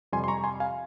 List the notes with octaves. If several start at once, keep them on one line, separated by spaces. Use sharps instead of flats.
F2 C3 G3 G#5 C6
C6
A#5 C#6
G#5 C6
F5 G#5